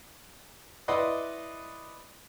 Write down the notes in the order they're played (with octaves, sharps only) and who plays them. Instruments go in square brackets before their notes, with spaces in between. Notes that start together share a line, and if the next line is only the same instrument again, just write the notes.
[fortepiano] E4 B4 D5 D#5 F#5 C6